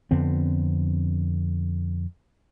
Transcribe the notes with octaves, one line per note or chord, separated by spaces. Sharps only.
F2 D3 B3 C4